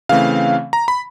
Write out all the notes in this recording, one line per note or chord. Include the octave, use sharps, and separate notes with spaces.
C#3 E3 A3 C4 F5
A#5
B5